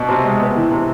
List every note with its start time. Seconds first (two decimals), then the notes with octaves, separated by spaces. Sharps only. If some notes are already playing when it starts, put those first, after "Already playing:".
Already playing: B2
0.09 C3
0.24 G#3
0.40 B3
0.56 E3
0.72 C3